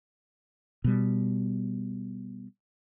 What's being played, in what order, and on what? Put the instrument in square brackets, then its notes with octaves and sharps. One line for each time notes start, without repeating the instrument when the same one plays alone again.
[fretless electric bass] B2 G3